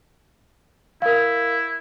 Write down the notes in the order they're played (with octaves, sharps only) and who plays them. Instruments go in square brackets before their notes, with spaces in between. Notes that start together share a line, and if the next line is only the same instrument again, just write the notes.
[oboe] E4 [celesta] A#4 F5